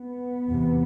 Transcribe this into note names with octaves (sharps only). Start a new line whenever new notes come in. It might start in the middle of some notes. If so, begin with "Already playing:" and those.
Already playing: B3
E2 C3